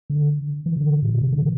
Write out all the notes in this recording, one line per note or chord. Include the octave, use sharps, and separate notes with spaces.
D3
E3
D3
A2
A#2
C3
D3
E3